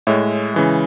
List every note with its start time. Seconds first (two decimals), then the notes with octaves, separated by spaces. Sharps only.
0.07 A2 G#3 C#5 E5
0.54 C#3 E3 G#3